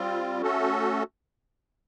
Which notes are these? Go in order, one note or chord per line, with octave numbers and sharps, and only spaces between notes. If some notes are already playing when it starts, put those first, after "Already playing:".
Already playing: G3 C4 F4
A3 C#4 F#4 A4